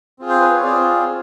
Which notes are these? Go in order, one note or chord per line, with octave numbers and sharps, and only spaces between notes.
C4 F4 G#4
C5
B4
C#5
C4 F4 G#4 D5